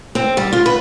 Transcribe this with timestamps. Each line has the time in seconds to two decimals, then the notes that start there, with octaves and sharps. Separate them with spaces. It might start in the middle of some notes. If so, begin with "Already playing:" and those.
0.15 C4
0.37 G3
0.53 F4
0.66 B4